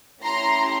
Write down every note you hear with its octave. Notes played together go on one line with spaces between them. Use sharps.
A3 C#4 E4 G4 A#5 C6